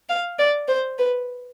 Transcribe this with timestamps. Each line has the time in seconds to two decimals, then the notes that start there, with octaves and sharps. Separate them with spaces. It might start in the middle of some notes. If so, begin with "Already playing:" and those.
0.09 F5
0.39 D5
0.68 C5
0.98 B4